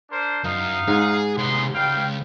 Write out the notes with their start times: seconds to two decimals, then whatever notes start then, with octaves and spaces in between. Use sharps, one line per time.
0.11 D4 A#4 C5
0.44 F#2 D#4 F5
0.88 G#2 G#4
1.38 C3 B3 D#4 G#4 C6
1.74 C#2 G3 F5 G5